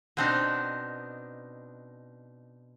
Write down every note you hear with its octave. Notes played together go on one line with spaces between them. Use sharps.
B2 B3 C4 D4 D#4